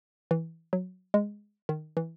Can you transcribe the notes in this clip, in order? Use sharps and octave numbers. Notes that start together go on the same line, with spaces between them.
E3
F#3
G#3
D#3
E3